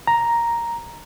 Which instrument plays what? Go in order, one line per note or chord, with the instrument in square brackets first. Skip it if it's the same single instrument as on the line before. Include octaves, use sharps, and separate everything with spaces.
[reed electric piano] A#5